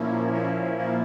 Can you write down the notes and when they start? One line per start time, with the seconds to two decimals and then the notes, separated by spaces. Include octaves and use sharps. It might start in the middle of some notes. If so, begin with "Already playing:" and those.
Already playing: A#2 F3 A#3 C#4 E4
0.31 A#2 F3 A#3 C#4 E4
0.79 A#2 F3 A#3 E4